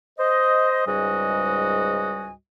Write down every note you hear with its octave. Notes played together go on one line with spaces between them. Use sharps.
C5 D#5
C#2 G#2 G3 F#4 D#5 G#5